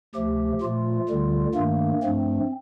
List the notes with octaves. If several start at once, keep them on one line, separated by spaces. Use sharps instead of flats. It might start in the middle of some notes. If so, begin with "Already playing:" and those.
D2 C3 F3 A3 G4
A#2 F3 A3 F4
D2 D3 G3
G2 D#3 A3 A#3
G2 F3 A3 C4